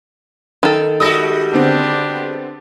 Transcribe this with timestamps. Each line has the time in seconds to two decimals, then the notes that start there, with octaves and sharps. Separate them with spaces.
0.63 D#3 A4
1.00 G3 G#3 F#4 D#6 E6 A#6
1.53 D3 B3 C4 D4 G4